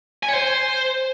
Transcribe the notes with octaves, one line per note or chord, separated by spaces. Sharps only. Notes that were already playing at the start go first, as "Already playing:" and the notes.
G#5
C#5
C5